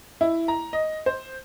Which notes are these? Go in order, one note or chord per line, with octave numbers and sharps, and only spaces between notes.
E4
A#5
D#5
C5